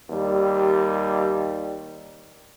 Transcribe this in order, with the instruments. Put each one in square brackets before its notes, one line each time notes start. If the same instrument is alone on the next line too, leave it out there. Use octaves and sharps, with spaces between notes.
[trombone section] D#2 G3